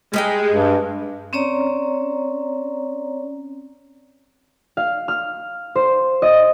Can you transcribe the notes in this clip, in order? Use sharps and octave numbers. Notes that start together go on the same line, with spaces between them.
G3 G#3 D#4 G5
G2
C4 C#4 C#5 D5 A#5
F5
F6
C5
D#5